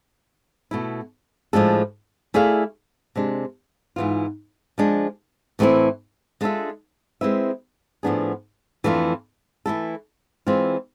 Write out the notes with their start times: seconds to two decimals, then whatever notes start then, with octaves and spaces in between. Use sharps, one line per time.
0.71 B2 A3 E4
1.53 A2 F3 G#3 D4 A4
2.34 A3 E4 G#4 D5 F5
3.16 C3 G#3 D4
3.96 G#2 E3 B3 F4
4.78 F3 G#3 D4
5.59 A2 E3 A3 C4 E4
6.41 G#3 D4 F4 A4 E5
7.21 G#3 C4 E4 B4 E5
8.03 A2 F3 B3 D4 G#4
8.84 F2 E3 A3 D4 F4
9.66 E3 A3 E4 A4
10.47 E3 G#3 C4 F4